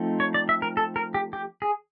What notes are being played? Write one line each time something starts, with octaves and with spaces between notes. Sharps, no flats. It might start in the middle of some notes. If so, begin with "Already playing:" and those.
Already playing: F3 A3 C4 D#4
C#5
D5
E5
A#4
A4
A#4
G4
G4
G#4